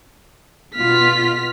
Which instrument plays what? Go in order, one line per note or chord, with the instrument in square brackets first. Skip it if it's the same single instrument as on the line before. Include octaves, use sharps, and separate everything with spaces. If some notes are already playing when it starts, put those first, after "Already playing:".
[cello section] B2 F4 [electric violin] F6 B6